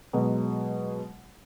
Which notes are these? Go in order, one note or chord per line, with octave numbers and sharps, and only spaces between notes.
B2 F#3 G#3